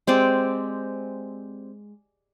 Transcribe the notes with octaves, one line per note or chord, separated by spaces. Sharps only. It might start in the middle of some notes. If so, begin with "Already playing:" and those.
G#3 C4 G4 D5